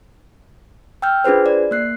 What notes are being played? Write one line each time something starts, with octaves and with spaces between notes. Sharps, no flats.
G5 E6 F6 G6
D4 F4 G#4 B4 C5
D5
A#3 F#6 C7